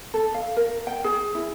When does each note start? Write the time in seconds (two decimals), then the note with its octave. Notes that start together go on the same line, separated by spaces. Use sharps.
0.14 A4
0.35 F5
0.57 A#4
0.87 G5
1.04 G#4
1.35 E4